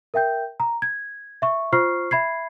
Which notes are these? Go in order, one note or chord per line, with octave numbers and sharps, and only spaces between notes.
A#4 E5 G5 G6
A#5
G#6
E5 C#6
F4 C5 C#6 F6 C7
E5 B5 G#6 C7